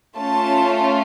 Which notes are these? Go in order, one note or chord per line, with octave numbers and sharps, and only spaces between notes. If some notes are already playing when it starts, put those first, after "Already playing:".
A3 C#4 F4 A5